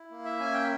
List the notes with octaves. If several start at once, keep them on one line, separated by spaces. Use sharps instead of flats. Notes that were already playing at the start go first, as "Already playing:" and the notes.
Already playing: E4
A#3
E5
C#4 G#5
G5